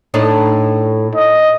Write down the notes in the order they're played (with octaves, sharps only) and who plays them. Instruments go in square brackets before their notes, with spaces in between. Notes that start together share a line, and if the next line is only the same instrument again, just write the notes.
[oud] A2 D4 D#4
[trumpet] D#5